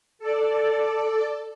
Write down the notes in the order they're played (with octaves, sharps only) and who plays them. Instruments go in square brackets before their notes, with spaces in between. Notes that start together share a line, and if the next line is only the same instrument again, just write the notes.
[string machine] A4 D5